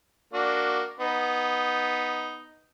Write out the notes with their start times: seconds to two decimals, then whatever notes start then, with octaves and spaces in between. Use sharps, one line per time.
0.33 A#3 D4 F#4
1.00 B3 D#4